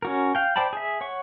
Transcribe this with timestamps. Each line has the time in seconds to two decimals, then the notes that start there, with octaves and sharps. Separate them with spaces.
0.02 C#4 F#4 A#4
0.35 F5 G5
0.56 C5 D5 G5 A5 B5
0.73 G#4 E5
1.01 C#5 F#5 C#6